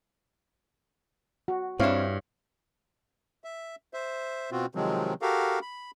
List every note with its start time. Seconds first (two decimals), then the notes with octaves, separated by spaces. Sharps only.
1.48 F#4
1.80 G2 C4 D4 E4 C#5 F5
3.44 E5
3.94 C5 E5
4.52 B2 C4 F4 F#4
4.75 C3 D#3 F3 F#3 G#3 C4
5.22 F#4 G4 A4 A#4 F5
5.62 B5